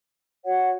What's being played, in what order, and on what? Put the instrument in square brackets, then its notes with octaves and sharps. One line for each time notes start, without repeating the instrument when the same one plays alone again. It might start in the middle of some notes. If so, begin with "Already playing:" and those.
[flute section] F#4 C#5 F#5